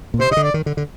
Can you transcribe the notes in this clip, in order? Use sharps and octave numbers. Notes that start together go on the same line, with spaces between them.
A#2
C3 C5
C3 D#5
D3
D5
D#3
D3
D3